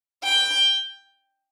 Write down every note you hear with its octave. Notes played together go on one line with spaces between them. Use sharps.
G5